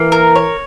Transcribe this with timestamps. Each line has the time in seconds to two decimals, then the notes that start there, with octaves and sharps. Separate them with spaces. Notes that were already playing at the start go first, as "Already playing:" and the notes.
Already playing: E3 A#3
0.12 A#4
0.35 C#5